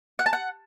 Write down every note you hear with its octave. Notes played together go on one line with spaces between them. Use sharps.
F#5
A5
F#5